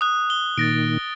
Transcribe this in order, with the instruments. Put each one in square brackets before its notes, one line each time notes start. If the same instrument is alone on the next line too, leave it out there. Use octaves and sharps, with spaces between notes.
[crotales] D#6 F#6
G7
[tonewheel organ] A#2 D#3 [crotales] A6 A#6 D7